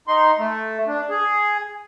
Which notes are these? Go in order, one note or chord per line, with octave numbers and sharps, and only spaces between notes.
D#4 C6
A3
D4
G#4